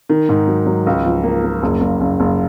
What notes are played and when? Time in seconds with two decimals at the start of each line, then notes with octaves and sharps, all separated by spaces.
0.09 D#3
0.29 G#2
0.47 F#3
0.66 F#3
0.86 C#2
1.05 F3
1.23 A#3
1.43 A#3
1.63 F#1
1.81 F#1
2.01 F#1
2.20 F#1